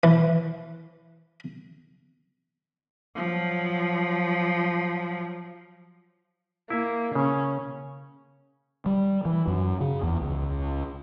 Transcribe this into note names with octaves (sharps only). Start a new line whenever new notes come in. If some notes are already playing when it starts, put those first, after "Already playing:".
E3
F3 F#3
A#3 E4 E5
C#3 C#4
G3
E3
F#2
C#3
E2
C#2